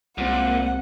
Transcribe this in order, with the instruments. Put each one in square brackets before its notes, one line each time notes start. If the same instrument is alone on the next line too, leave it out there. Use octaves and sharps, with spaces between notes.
[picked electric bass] C2 G#3 C4 [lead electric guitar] A#2 [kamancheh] F#5